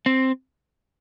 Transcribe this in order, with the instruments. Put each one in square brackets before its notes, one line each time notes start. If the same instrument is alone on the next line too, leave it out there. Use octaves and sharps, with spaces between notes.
[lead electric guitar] C4